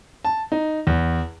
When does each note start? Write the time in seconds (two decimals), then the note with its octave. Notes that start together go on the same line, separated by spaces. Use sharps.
0.25 A5
0.52 D#4
0.87 E2